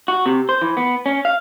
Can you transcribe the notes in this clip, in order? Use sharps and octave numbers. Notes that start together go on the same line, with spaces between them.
F#4
C3
C5
E3
B3
C#4
F5